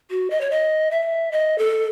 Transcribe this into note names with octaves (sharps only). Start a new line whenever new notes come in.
F#4
D#5
C#5
D#5
E5
D#5
A4